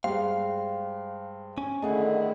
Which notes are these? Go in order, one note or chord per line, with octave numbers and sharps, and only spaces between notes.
G2 G#3 C5 F5 G5 C6
C#4 G#5
D3 D#3 A3 E4 G#4 D#5 F#5